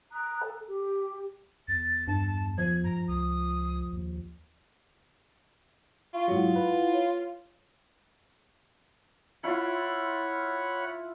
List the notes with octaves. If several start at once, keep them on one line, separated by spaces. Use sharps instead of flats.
A#5 D#6 F#6
A4
G4
E2 A6
G2 A5
F3 G#6
G#2 A#5
C#2 D#6
D#2
F4 C#6
G#2 F#3 E4 F#5
B4
C#5
E4 F4 C#5 F#5 B5